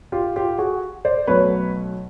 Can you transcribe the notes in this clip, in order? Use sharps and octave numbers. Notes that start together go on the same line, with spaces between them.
F4 G4
F4 G4
F#4 G#4
C5 D5
B1 B2 F#3 A3 B4 C#5